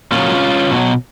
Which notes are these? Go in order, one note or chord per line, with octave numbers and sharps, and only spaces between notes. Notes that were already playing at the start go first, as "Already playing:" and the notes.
A#2 F#3 C#4 F4
B2 F#3